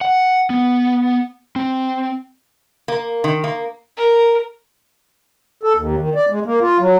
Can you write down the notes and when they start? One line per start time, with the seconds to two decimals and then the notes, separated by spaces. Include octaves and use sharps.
0.01 F#5
0.50 B3
1.56 C4
2.88 A#3
3.24 D#3
3.44 A#3
3.97 A#4
5.63 A4
5.77 D#2
5.98 D#3
6.15 D5
6.30 G#3
6.46 A#3
6.61 F4
6.79 F#3